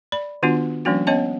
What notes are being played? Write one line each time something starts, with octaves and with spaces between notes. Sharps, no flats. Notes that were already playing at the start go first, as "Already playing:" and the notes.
D5 B5
D#3 B3 D4 F4 F#4
F3 G3 A#3 C#4 D4 F#4
B3 C#4 C#5 D#5 F#5 A5